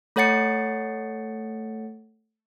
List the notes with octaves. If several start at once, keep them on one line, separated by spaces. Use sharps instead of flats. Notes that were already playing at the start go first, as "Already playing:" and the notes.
A3 A4 C#5 F#5 A6 C#7